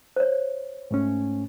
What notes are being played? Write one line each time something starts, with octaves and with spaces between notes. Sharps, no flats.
C5 C#5
G#2 A3 C#4